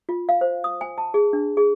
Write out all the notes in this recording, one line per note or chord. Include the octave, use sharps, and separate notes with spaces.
F4
F5
C5
D#6
G#5
A5
G#4
D4
G#4